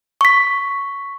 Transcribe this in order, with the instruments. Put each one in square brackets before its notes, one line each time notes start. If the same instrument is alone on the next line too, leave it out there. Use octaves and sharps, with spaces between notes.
[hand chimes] C#6 B6